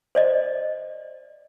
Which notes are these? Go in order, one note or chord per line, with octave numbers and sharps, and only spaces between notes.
C5 D5 D#5